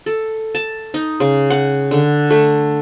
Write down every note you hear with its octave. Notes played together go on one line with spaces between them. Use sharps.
A4
A5
D#4
C#3
F#5
D3
A3